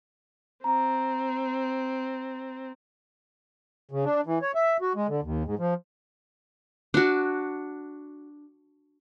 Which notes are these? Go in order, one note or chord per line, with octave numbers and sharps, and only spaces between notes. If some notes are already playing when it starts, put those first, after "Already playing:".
C4 A#5
C#3
D4
E3
C#5
E5
F#4
G#3
D3
D#2
G#2
F3
D4 F#4